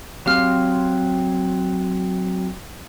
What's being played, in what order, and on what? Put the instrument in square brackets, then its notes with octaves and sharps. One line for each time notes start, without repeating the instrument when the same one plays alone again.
[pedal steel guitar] F#3 C4 C6 [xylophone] G4 F5 F6